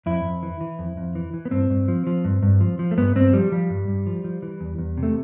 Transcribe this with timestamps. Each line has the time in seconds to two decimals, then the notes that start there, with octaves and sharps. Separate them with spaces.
0.06 F2 E4
0.24 F2
0.43 E3
0.61 E3
0.79 F2
0.97 F2
1.15 E3
1.34 E3
1.45 B3
1.51 G2 C4
1.70 G2
1.88 F3
2.07 F3
2.24 G2
2.42 G2
2.61 F3
2.79 F3
2.91 A3
2.97 G2 B3
3.15 G2 C4
3.33 F3 G3
3.52 F3 G3
3.70 G2
3.88 G2
4.06 F3
4.24 F3
4.42 E3
4.61 E2
4.78 E2
4.97 C3
5.03 A3